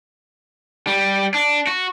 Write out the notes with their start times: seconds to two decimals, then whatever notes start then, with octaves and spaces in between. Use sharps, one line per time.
0.87 G3
1.34 D4
1.67 F#4